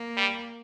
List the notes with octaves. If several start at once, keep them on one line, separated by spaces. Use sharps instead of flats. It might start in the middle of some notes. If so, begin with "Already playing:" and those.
Already playing: A#3
G3